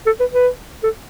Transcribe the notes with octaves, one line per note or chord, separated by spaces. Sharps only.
A4
B4
B4
A4